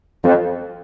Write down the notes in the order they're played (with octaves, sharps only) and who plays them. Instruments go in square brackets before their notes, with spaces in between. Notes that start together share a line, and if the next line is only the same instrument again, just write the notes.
[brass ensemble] F2